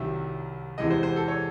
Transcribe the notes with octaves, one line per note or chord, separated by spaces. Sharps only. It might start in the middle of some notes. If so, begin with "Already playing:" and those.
Already playing: C2 C3 D#3 F#3 E5
E2 C3 E3 G#3 D#5
C5
C5
A4
C#5